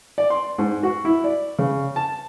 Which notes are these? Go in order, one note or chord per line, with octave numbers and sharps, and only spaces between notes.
D5
C6
G#2
F#4
E4
D5
C#3
A5